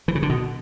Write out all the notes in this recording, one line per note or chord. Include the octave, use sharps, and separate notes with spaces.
E3
C#3
D3
B2